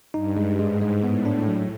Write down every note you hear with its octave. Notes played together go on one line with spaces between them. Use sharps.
G2 D#4
G#3
G#2 G#3
G#3
A2 B3
D4
F#3